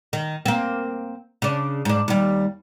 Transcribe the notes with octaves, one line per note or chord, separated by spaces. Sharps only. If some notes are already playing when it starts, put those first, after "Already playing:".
D#3
A#3 C4
C#3 D4
G#2 D4
D#2 G3